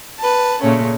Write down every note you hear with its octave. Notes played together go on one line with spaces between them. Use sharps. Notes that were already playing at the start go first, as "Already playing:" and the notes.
B4 A5
A#2 C#3 A3 C#4